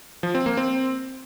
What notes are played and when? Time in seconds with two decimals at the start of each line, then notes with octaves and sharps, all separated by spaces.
0.23 F3
0.35 C4
0.46 A#3
0.57 C4